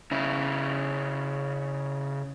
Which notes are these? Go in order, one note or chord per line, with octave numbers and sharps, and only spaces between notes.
C#3 E4